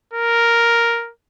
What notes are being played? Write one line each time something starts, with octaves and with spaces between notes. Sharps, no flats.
A#4